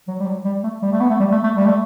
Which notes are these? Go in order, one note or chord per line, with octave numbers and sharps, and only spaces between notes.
F#3
G3
F#3
G3
A3
G3
A3
B3
A3
G3
A3
A3
G3
A3